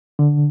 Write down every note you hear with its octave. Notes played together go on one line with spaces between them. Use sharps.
D3